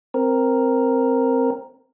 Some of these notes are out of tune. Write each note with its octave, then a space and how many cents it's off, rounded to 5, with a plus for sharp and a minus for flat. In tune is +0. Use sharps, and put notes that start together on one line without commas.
C4 +0 A#4 +0